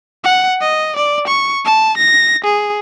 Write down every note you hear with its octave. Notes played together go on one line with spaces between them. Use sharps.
F#5
D#5
D5
C#6
A5
A#6
G#4